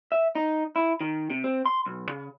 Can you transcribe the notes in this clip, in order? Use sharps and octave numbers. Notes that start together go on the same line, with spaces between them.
E5
D#4
E4
D#3
C3
C4
C6
B1
C#3